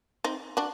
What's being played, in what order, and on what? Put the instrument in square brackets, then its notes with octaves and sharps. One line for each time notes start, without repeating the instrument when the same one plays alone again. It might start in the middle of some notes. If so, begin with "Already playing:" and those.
[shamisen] C4 D#4
D4 F#4